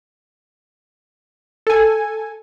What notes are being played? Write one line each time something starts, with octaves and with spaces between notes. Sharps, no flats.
A4 G#5